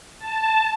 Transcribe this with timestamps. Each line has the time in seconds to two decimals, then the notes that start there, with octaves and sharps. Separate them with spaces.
0.19 A5